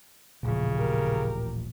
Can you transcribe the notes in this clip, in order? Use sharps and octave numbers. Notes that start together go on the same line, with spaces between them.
D#1 A1 A#2 C#3 F3
G4 A#4